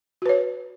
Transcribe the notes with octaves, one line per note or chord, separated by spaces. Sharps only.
F#4 B4 C#5